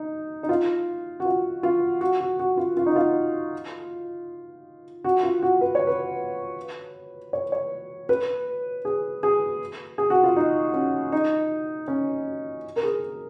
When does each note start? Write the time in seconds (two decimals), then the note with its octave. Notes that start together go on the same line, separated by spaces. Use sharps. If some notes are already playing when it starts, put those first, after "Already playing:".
Already playing: D#4
0.43 D#4
0.49 F4
1.20 F#4
1.25 F4
1.63 F4
2.01 F#4
2.20 F#4
2.40 F#4
2.57 F4
2.77 F4
2.86 D#4
2.96 F4
5.04 F#4
5.23 F4
5.43 F#4
5.61 B4
5.75 C#5
5.87 B4
7.33 C#5
7.52 C#5
8.09 B4
8.85 G#4
9.23 G#4
9.98 G#4
10.10 F#4
10.23 F4
10.36 D#4
10.74 C#4
11.12 D#4
11.88 C#4
12.76 A#4
12.83 G#4